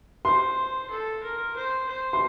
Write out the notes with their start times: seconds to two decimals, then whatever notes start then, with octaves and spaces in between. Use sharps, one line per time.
0.25 C5 C6
0.90 A4
1.23 A#4
1.56 C5
1.88 C5
2.13 C6